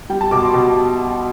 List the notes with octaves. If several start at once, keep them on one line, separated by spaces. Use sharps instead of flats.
G3 G5
A5
B2 D6
C6
B2